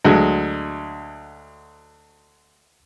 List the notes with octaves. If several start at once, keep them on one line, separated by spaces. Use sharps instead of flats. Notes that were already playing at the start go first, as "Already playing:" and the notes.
D2 F#3 G#3